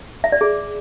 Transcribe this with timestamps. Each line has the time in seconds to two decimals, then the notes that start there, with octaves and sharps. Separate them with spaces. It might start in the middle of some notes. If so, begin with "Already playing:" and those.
0.24 E5
0.32 D5
0.41 G#4